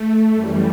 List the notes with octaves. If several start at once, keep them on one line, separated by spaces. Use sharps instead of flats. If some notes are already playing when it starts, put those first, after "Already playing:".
Already playing: A3
F#2 E3 G3